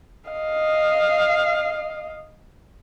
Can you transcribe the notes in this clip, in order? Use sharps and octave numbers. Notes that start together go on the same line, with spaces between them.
D#5 F5